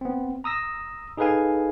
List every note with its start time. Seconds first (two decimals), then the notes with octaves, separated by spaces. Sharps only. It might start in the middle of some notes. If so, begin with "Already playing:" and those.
0.01 B3 C4
0.44 A#5 D#6 E6 A#6
1.17 D#4 G#4 A4 B4 F5 G#5